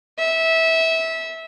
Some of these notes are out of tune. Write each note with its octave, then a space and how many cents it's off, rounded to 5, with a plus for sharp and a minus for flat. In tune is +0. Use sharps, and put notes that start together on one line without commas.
E5 -20